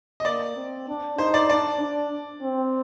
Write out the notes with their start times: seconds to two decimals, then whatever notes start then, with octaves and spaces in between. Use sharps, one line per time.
0.20 D#5
0.25 A#3 D5
0.56 C4
0.88 D4
1.18 D#4 C5
1.34 D5
1.49 D4 D5
1.81 D4
2.43 C4